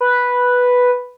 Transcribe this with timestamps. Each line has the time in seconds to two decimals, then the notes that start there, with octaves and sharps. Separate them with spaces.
0.01 B4